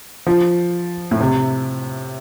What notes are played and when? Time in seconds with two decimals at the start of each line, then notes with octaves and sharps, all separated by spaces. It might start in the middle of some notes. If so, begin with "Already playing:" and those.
0.26 F3
1.11 A2
1.20 C3